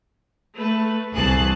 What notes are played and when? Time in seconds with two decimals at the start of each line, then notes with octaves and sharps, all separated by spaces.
0.55 A3 B4
1.14 C2 E3 G#4 A5 F#6